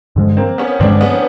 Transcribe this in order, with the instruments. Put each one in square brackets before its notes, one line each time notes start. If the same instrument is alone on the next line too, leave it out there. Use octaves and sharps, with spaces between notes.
[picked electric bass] G2 D3 F3 G#3
[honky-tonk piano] A#3 C4
B3 C#4
[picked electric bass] G2 D3 F3 G#3 [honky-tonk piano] C4 D4
[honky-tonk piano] B3 C#4